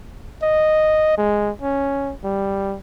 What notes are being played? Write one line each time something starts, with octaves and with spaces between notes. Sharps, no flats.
D#5
G#3
C#4
G3